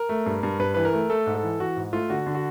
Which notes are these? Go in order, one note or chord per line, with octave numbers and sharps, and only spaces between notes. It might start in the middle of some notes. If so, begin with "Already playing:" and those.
Already playing: A#4
A3
G2
G2
G2 B4
E3 B4
A#4
A3
A3 A4
G#2
A4
E3
E3 F#4
G#2
A3 F4
D3 F#4
D3
F#4